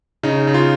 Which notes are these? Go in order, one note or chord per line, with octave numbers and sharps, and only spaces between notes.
C#3 D#4
C#3
F4